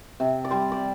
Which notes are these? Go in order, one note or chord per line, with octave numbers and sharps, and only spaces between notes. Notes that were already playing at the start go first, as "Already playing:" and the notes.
C3
D5
G3 C5
D5